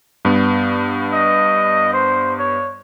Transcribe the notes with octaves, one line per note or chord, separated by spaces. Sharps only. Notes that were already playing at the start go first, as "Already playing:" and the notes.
G2 B3
D#5
C5
C#5